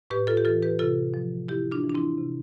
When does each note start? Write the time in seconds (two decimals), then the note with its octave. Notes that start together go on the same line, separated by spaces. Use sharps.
0.10 A2 G4 B4
0.27 F4 A4
0.37 G4
0.45 E3 F4 A4
0.62 G4 B4
0.79 C3 F4 A4
1.14 F3
1.48 C3 E4 G4
1.72 D4 F4
1.83 E3
1.90 D4
1.95 C4 E4
2.18 C3